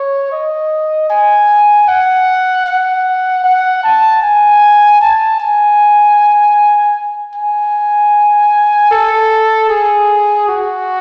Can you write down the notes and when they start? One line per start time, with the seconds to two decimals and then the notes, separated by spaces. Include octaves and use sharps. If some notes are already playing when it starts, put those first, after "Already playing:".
Already playing: C#5
0.32 D#5
1.10 G#5
1.88 F#5
2.66 F#5
3.44 F#5
3.84 A5
4.22 G#5
5.01 A5
5.40 G#5
7.35 G#5
8.91 A4
9.69 G#4
10.48 F#4